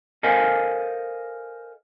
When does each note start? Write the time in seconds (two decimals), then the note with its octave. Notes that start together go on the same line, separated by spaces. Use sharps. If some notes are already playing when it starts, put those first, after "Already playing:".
0.23 A4 A#4 C5 D#5 F5 G#5